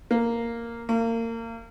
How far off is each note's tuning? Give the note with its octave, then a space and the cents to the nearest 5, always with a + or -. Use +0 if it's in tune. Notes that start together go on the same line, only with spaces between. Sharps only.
A#3 -5
A#3 -30